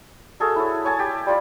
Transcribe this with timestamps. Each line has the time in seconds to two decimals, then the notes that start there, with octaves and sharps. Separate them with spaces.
0.40 F#4 G#4 A4 E5
0.56 E4 C#5
0.85 C#5 G#5 A5
0.99 G4
1.27 G3 F4 D5